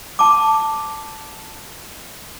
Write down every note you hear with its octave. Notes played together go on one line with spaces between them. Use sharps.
A5 D6